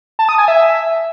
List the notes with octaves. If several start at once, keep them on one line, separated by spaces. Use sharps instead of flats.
A5
D#6
G#5
E5